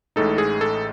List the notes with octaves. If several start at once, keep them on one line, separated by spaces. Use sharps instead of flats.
A1 A2 G#3 D#4 A4
G#4
A4